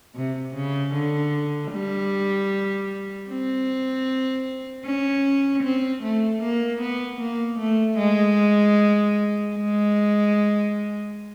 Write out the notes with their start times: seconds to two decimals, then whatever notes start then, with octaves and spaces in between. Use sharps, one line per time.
0.15 C3
0.55 C#3
0.94 D3
1.72 G3
3.29 C4
4.85 C#4
5.63 C4
6.03 A3
6.42 A#3
6.81 B3
7.20 A#3
7.59 A3
7.98 G#3
9.55 G#3